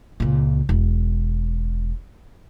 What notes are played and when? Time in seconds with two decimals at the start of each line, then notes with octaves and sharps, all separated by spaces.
0.20 C#2 A#2
0.69 E1